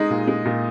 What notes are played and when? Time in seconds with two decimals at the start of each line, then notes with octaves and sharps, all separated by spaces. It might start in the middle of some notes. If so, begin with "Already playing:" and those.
Already playing: G#3 D#4
0.10 A#2
0.27 G#3
0.45 A#2